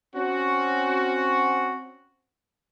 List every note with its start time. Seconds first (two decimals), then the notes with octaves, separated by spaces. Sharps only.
0.15 C4 C#4 F#4